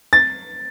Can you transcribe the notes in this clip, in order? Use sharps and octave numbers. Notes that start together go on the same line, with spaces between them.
A6